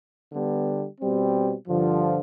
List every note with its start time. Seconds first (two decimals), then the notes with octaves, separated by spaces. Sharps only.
0.32 D3 G3 B3
1.00 B2 G3 C4
1.68 G2 D3 F3